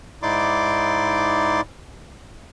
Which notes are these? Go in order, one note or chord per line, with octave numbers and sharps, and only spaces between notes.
G#2 D#4 E4 D5 C6 D6